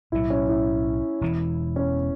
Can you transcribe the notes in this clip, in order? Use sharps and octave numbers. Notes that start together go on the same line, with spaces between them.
B1 A2 F#3 E4
C#4
E4
E1 E2 E3
C#4